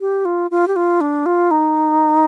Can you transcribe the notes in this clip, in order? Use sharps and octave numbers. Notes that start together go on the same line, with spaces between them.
G4
F4
F4
G4
F4
D4
F4
D#4